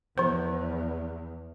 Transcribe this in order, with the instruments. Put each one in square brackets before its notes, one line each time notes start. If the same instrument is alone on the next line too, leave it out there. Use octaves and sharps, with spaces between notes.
[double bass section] E2 [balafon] F3 C5